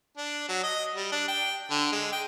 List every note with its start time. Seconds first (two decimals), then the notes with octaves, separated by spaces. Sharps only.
0.18 D4
0.49 F#3
0.63 D#5
0.95 G3
1.12 D4
1.28 G5
1.71 D3
1.92 G#3
2.12 G5